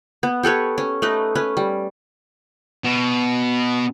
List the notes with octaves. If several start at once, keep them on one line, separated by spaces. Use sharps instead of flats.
B3
G4 A4 B4 C#5
C#4
A3 D#4 B4
C#4 B4
G3
B2